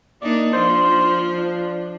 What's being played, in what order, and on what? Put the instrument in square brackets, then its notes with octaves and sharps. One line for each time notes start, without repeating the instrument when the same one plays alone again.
[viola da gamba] A#3 D4 D#4 [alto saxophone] D5
[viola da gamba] F3 F4 [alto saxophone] C5
[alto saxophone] D4